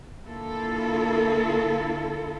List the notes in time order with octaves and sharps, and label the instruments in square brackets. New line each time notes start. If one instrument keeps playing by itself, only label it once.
[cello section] D3 A#3 E4 F4 A4